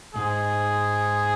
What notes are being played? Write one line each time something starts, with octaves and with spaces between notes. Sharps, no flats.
G#2 G#4